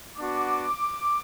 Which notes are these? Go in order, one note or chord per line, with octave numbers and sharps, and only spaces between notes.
B3 D4 F#4 D6